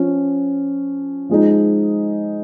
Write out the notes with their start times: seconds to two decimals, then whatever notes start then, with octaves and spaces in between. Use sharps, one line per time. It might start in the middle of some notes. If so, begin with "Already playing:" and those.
Already playing: F3 C#4
1.29 F3 G#3 D#4